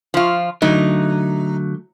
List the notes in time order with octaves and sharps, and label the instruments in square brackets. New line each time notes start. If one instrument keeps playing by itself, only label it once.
[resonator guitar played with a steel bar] F3 F4
[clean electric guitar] D3 F#3 A3 [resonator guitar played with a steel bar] D#4